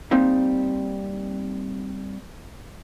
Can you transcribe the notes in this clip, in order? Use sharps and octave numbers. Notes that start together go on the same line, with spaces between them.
G3 A#3 C4 D#4